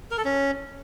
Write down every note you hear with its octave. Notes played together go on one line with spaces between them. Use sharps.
A#4
A4
C#4